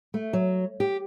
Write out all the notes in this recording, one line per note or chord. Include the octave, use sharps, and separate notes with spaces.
A3
F#3
G4